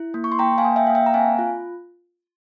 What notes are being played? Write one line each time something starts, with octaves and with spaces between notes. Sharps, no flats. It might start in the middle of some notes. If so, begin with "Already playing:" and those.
Already playing: E4
A#3
C#6
C6
A#3 G5 A#5
F5 G#5
A#3
E5 G5
A#3 F5
E5 G5
A#5
C4 F5 G#5
F4